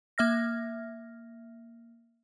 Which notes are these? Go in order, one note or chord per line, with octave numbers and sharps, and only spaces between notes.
A#3 E5 F6 A#6